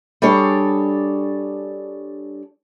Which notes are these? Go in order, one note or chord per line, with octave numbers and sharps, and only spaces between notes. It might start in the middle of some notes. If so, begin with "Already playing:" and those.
G3 D4 G#4 A4 C#5